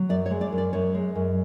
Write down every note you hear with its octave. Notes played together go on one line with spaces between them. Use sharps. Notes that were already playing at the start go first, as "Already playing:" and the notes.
Already playing: F#3
F#2 D5
C#5
G#3
D5
F#2
D5
F#2 C#5
G#3
F#2